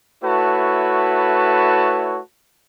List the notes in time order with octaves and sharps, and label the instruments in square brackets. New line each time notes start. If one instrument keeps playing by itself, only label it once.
[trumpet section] A3 E4 F#4 B4 C#5 A5